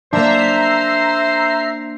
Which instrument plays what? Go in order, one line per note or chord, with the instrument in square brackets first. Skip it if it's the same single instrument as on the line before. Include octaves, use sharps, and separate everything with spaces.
[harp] A#3 D4 [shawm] C5 [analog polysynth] E5 A#5 C7